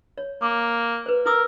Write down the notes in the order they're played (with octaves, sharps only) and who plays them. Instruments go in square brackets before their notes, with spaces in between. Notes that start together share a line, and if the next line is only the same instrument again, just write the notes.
[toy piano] C#5
[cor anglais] A#3 [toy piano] D6
[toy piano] B4 C5
[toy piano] E4 D#6 E6 [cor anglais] A#4